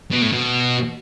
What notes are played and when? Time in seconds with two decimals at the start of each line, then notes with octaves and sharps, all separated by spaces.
0.12 B2
0.22 A2
0.33 B2